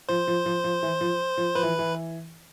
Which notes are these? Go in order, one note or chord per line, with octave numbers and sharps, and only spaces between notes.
F3 C5
F3
F3
F3
E3
F3
F3
F3 B4
E3
E3